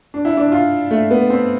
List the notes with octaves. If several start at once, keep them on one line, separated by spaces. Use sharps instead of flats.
D4
E4
D4
F4
A3
B3
C4